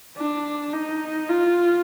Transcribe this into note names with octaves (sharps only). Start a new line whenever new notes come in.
D4
D#4
F4